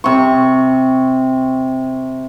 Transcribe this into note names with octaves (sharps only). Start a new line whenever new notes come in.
C3 C#6